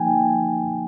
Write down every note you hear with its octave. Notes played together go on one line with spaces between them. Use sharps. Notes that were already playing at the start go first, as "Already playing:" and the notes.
Already playing: F3 A#3 D#4 G5 G#5